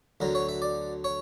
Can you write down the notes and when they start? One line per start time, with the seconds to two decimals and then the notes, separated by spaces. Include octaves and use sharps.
0.20 D2 D3 F#3 A#4
0.35 C#5
0.49 E5
0.62 D5
1.04 C#5